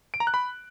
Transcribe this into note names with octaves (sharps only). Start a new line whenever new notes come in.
D7
A#5
F#6
B5